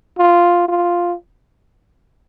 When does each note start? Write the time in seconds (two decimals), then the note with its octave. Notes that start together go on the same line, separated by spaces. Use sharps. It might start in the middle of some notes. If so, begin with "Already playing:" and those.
0.18 F4
0.69 F4